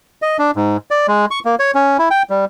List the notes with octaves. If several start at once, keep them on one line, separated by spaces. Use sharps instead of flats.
D#5
D4
G#2
D5
G#3
C#6
A#3
C#5
C#4
E4
G5
G3